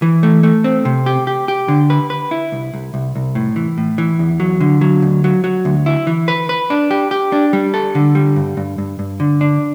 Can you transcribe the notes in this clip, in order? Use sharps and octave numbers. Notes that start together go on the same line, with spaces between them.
E3
A3
A3
C4
C3
G4
G4
G4
D3
B4
B4
E4
C2
C2
C2
C2
A2
E3
A2
E3
E2
F#3
D3
F#3
D2
F#3
F#3
D2
E4
E3
B4
B4
D4
G4
G4
D4
G3
A4
D3
G3
G2
G2
G2
G2
D3
D4